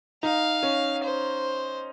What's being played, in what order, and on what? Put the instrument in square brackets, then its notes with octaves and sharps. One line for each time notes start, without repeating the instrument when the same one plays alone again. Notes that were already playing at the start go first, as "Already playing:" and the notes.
[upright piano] D#4 [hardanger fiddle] F5
[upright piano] C#4
[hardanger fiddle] C5